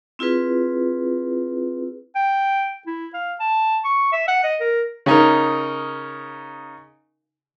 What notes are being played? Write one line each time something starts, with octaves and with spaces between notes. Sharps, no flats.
C4 E4 F4 G#4 B4
G5
E4
F5
A5
C#6
E5
F#5
D#5
A#4
C#3 D#4 A#4